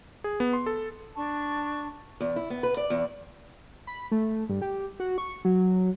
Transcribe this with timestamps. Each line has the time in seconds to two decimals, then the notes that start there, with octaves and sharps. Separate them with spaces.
0.24 G#4
0.40 B3
0.53 C6
0.66 A4
1.16 D4 A5 C#6
2.20 E2
2.36 E4
2.50 B3
2.63 B4
2.77 D5
2.90 E2
3.87 B5
4.12 A3
4.49 G2
4.62 G4
5.00 F#4
5.18 C#6
5.45 F#3